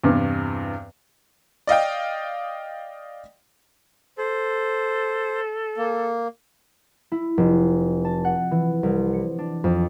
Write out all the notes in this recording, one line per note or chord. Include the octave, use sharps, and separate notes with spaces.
E2 G2 C3
D5 D#5 F5 G5
A4 C5
A#3
E4
F1
A5
F#5
E3
C2
C#7
D4
F2